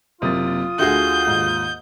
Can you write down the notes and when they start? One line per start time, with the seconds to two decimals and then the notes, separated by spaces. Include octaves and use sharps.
0.22 F#1 C3 A#3 F4 D#6 A6
0.79 D2 D3 F#4 G#4 E5 G6
1.27 D#2 G#2